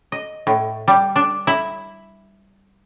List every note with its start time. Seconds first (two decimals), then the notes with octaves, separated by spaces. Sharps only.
0.12 D#5
0.47 A2
0.88 G3
1.16 D4
1.47 E4